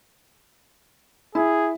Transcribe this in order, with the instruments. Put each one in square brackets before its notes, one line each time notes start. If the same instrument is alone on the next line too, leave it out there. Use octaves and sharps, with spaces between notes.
[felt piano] E4 [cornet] G#4